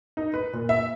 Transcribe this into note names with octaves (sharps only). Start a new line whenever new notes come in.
D#4
B4
A#2
E5